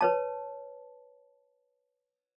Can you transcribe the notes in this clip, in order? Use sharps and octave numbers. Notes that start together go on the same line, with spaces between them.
B4 C#5 A5